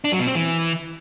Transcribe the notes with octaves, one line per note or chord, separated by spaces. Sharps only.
D4
F#3
B2
C4
E3